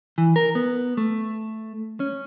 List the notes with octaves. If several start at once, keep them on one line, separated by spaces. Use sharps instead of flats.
E3
A#4
B3
A3
C#4